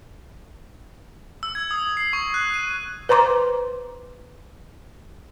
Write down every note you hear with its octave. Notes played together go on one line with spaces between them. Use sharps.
E6
G#6
D#6
C7
C#6
F#6
D#7
B4 C5 A#5 C6 D6